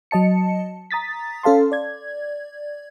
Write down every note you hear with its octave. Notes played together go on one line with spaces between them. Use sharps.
F#3 D#5 A5 C#7
A#5 D#6 A6 B6
C#4 A4 F5 A5 C6
D5 G#6